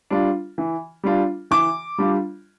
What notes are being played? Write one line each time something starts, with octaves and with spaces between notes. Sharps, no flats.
G3 D4 F4
E3
G3 D4 F4
E3 D6
G3 D4 F4